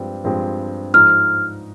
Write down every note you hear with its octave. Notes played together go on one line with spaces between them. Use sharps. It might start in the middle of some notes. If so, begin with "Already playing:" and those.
Already playing: G2 F3 G#3 C4 G4
G2 F3 G#3 C4 G4
G#2 F3 G#3 D#4 F6